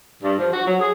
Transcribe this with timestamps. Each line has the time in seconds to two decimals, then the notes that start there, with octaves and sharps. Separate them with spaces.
0.22 G2
0.39 F3
0.53 F#4
0.66 F#3
0.80 G#4